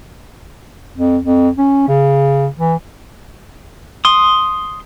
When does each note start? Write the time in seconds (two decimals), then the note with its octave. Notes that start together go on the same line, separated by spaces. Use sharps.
0.97 F2
1.24 F2
1.57 C#4
1.88 C#3
2.58 E3
4.05 C6 D#6